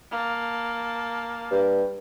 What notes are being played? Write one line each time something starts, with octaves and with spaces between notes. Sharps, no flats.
A#3 A5
G2